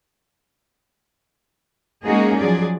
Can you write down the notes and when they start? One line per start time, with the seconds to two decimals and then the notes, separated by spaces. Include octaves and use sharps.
2.05 G#3 A#3 C#4 D#4 F#4 G#4
2.39 F3 F#3 G#4 D5